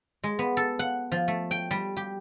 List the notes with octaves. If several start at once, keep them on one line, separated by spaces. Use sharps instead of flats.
G#3
B3
A4
F#5
F3
A3
G5
G3
G4